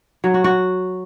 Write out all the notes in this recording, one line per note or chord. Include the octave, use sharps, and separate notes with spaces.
F#3
F#4
F#4